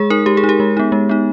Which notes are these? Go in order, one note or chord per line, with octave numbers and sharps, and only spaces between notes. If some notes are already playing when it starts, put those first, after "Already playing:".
Already playing: G#3 G#4
D#4 A#4
G#3 G4
G#4
D#4
G4
G#3
B3 D#4
G#3
B3 D#4